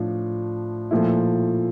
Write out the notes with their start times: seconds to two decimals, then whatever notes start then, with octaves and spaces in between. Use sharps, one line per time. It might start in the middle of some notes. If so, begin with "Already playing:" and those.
Already playing: A2 F3 D4
0.91 A#2 F3 A3 E4